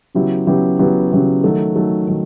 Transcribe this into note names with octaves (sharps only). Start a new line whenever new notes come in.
C#3 F#3 B3 E4 G4
C#3 F#3 B3 E4 G4
C#3 F#3 B3 E4 G4
C#3 F#3 B3 E4 G4
D#3 F#3 A3
D#3 F#3 A3
D#3 F#3